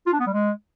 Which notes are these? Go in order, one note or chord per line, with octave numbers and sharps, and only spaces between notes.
F4
D4
B3
G3
G#3